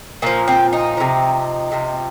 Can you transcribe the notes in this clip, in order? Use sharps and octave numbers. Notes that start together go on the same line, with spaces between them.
A#2 F3 A#3
C4
D#4
C3 F3
C3 F3